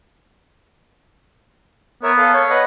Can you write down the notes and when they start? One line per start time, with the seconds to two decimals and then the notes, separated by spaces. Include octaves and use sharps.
2.03 B3 A#4 C#5 E5
2.18 A4 F5
2.34 C#5
2.50 B4 D#5 F#5